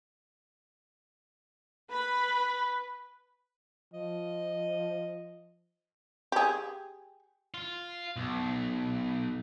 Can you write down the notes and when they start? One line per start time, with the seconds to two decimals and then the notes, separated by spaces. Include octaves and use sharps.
1.91 B4 B5
3.93 F3 D#5
6.32 G4 G#4
7.54 F4
8.16 B1